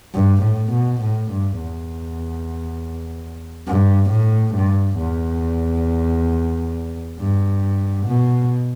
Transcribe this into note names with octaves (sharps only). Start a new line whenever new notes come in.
G2
A2
B2
A2
G2
E2
G2
A2
G2
E2
G2
B2